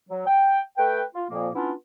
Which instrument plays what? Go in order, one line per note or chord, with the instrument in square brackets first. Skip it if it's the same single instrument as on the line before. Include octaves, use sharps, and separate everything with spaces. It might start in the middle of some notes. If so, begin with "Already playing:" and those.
[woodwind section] F#3
G5
A3 B4 G5
F4
F2 A#2 F3 A#3
B3 C#4 D4 E4 F4